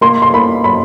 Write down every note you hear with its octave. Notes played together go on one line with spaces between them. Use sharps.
A#3 C6
C6
A#3 B5
F#3 B5